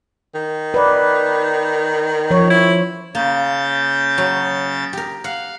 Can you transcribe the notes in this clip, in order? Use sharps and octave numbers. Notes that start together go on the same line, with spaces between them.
D#3
B4 D5
F3 C#5
E4
C#3 A#3 G6 A6
F#3
G4 A#4
F5 F#5